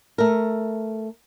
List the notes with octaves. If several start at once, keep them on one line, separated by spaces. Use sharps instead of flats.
A3 A#4